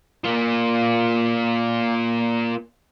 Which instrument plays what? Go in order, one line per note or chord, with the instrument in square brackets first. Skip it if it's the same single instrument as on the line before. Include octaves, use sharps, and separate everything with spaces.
[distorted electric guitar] A#3 F4